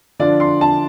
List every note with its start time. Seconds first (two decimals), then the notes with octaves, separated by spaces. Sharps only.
0.19 D3 F3 D4 F4 D5
0.40 C6
0.61 A5